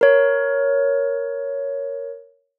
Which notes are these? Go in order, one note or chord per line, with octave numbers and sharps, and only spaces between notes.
A#4 C#5